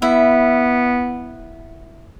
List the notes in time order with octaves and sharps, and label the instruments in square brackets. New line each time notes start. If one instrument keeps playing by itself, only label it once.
[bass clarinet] B3 [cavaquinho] E4 E5